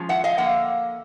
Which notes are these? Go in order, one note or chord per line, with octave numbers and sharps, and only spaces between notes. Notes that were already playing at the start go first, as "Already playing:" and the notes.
Already playing: F3 G#3 C#4
E5 F#5
D#5 F5
D3 F3 A#3 E5 F#5